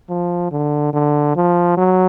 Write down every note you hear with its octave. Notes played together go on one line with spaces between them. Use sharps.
F3
D3
D3
F3
F#3